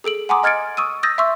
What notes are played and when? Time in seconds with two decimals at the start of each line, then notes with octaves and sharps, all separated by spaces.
0.04 G#4 A4 D7 F#7
0.29 F#5 G#5 A#5 C6 D6 D#6
0.43 D#5 F6 G#6 A6 C#7 D7
0.77 C#6 D#6 E6 D#7
1.03 D#6 E6 G6 A6 A#6
1.18 E5 C6 C#6 E6